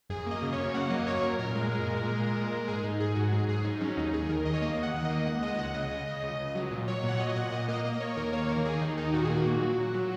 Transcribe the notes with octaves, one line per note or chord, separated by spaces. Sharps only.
F#2 G#4
A#3 D#5
C#3
C#5
F#2
A#3 F#5
F#3 D#5
F#2 C#5
F#2 A#4
A#2 A#4
G#3
G#3
A#2
G#3
A#2
G#3
G#3
G#2 G#4
G#2 D#4
G#2 G#4
G#2 F#4
F#3 G#4
G#2 G#4
G#2 D#4
F#3 C#4
D#2 D#4
D#2 G#4
D#3 A#4
D#2 D#5
C#5
A#3 D#5
D#2
F#5
D#3
D#5
A#3
C#2 F#5
G#3 D#5
C#2 F#5
C#3 D#5
C#3
C#3
C#2
C#2
F#3
A#2
F#3 C#5
A#2 F#5
F#3 D#5
A#2 F#5
A#2 D#5
A#3 D#5
A#3 D#5
A#3 C#5
D#2 A#4
A#3 C#5
D#3 A#4
D#3 G#4
D#2 D#4
D#3 D#4
A#2 F#4
A#3 G#4
F#4
A#2
F#3
A#2
F#3